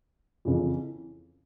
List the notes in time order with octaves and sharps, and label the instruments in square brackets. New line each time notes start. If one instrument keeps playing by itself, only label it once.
[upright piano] F2 C#3 E3